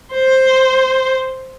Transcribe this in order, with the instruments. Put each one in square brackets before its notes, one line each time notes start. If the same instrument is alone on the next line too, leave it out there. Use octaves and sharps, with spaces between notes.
[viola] C5